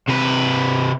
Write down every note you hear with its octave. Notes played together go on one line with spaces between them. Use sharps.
C3 B4